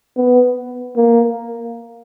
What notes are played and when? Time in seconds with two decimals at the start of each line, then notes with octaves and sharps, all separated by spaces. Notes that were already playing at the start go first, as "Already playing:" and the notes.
0.17 B3
0.96 A#3